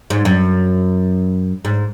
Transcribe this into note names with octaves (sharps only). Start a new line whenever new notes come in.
G#2
F#2
G#2